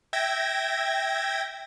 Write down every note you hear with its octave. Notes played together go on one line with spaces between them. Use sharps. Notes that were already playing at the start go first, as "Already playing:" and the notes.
E5 G5 G#6 A#6